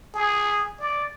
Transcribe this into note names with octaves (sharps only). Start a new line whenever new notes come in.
G#4
D5